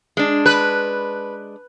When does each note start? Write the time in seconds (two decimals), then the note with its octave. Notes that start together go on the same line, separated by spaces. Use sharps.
0.17 G#3 D4
0.46 B4